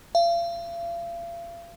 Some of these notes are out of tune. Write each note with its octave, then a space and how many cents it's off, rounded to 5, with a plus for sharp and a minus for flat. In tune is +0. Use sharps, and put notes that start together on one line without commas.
F5 -40